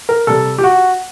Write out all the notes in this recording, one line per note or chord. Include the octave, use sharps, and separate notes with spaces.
A#4
C3 G3 A4
G4
F#4